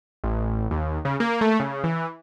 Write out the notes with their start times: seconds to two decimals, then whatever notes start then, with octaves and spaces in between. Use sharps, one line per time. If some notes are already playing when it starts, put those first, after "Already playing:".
0.24 A1
0.71 D#2
1.05 C#3
1.20 A#3
1.41 A3
1.60 C#3
1.84 E3